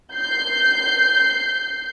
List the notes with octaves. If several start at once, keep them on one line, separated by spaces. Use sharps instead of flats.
G6 C7